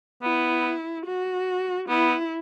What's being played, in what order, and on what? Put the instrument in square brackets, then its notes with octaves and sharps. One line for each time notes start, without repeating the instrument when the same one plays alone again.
[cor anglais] B3 [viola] E4
[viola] F#4
[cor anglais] B3 [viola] E4